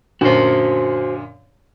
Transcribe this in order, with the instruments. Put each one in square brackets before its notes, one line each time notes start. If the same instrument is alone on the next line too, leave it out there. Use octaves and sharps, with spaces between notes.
[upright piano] F#2 A#2 D3 [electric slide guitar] F#4 C5